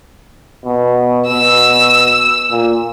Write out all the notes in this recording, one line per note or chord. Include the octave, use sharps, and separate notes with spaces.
B2
B2 E6
A#2